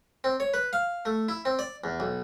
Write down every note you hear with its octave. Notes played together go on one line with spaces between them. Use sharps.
C4
C#5
B4
F5
A3
E4
C4
D5
E2
B1